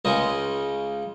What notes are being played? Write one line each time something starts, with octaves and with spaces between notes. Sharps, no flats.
C#2 C#3 G#3 D#5